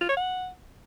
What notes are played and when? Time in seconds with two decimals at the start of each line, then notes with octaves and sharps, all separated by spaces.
0.01 F4
0.09 C#5
0.17 F#5